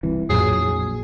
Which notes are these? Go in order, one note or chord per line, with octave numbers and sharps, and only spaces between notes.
C2 E3
A#1 F2 A2 F3 F#3 G#4